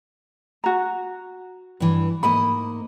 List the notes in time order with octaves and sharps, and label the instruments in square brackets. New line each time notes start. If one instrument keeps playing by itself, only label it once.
[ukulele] F#4 A#5
[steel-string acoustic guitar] G2 E3
[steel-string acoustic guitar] G#2 A#3 D#5 [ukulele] B5